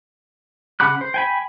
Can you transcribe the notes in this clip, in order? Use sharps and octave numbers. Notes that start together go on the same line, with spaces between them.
C#3 F#5 B5 D6 F#6
C5
G5 G#5 B5